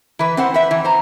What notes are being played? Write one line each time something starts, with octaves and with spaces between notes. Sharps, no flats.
E3 B4
C4 C5 F#5
B4 E5
E3
C5 A#5